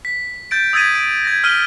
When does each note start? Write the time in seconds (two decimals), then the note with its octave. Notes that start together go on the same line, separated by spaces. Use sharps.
0.05 B6
0.51 G6 A6 D7
0.73 D#6 E6 G#6 A6 B6 D#7
0.95 D7
1.25 G#6 A#6
1.44 E6 F6 B6 D#7 G7